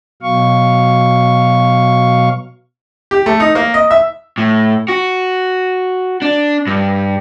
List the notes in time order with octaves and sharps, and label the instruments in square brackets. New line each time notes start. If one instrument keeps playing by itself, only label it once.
[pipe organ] B2 F#3 F5 C#6
[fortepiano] G4
A3
D#4
A#3
D#5
E5
[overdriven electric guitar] A2
F#4
D4
G2